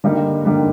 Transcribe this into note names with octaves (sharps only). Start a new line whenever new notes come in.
D3 G3 A#3 D#4
D3 G3 A#3 D#4